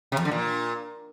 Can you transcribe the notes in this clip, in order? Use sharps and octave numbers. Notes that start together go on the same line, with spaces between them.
C3
F2
D3
A#2